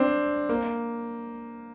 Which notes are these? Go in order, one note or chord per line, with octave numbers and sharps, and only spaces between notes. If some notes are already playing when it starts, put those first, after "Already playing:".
Already playing: C4 D4
A#3